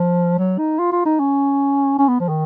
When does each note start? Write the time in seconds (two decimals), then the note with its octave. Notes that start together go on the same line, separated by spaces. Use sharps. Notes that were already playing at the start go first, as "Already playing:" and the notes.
Already playing: F3
0.39 F#3
0.58 D#4
0.79 F4
0.92 F4
1.05 D#4
1.19 C#4
1.99 C#4
2.08 B3
2.20 F3
2.29 D#3